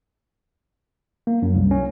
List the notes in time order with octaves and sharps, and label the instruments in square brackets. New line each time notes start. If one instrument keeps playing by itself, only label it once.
[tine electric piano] A#3
F#2
C2
C#4